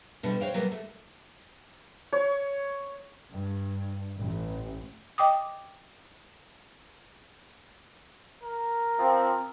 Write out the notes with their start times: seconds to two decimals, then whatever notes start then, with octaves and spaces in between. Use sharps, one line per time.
0.23 B2 D3 F3 G3
0.40 F#4 C5 C#5 F5 G5
0.54 B2 F#3 G3 A#3 B3
0.72 A3
2.12 C#5
3.30 G2
4.18 A1
5.18 D#5 G5 D6 D#6
8.43 A#4
8.99 F3 C4